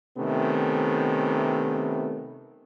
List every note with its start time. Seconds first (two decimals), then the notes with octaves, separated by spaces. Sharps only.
0.17 C3 D#3 A3 B3 C#4